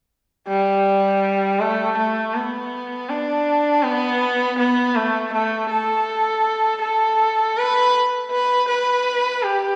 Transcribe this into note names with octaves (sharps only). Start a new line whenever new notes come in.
G3
A3
A3
B3
D4
B3
B3
A3
A3
A4
A4
B4
B4
B4
G4